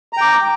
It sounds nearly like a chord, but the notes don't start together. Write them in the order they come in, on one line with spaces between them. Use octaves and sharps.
A#5 G5 D6